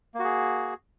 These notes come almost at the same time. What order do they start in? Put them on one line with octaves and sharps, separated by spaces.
A#3 F#4 G#4